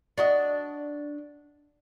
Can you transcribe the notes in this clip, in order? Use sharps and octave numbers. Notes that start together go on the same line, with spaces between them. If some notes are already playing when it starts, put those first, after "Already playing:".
D4 F#4 D#5